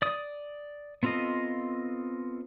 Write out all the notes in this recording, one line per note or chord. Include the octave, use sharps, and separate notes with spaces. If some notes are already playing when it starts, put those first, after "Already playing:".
D5 D#6
B3 C4 F4 A4 D#5